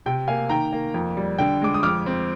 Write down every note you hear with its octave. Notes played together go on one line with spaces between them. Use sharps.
C3 G5
A#3 F5 G#5
D#3 G5 A#5
A#3
F2
G3
D3 G5
G#3 D6
D#6
F2 D6 F6
C4